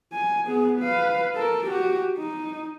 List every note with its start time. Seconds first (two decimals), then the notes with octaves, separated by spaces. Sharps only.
0.12 G#5
0.47 B3 G#4
0.79 B4 F5
1.36 A4 A#4
1.67 F#4 G4
2.18 D#4